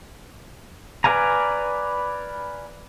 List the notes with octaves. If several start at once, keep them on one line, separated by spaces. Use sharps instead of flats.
B4 D5 F5 G#5 A#5